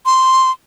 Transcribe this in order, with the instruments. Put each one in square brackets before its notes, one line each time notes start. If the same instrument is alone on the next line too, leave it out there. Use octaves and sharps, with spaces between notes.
[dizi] C6